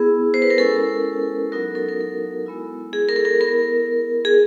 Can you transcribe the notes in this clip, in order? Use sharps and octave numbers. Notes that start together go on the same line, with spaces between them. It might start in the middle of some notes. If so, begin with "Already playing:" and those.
Already playing: B3 E4 G#4
C5
B4
A#4
G#3 C#4 E4 A4
F#3 B3 D#4 F#4 A#4
A4
A#4
A4
G#3 B3 E4
G#4
A#4
A4
A#4
B3 E4 A#4
G#4